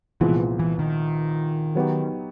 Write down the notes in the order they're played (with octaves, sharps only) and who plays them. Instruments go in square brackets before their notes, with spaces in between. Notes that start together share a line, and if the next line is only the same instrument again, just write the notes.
[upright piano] C2 A#2 F3 G#3 B3 [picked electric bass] E3
[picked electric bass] E3
D#3
[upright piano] F#3 B3 D#4 G4